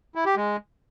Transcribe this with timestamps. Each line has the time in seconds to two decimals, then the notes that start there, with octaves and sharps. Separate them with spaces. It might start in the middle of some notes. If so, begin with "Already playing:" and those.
0.15 E4
0.26 G4
0.36 G#3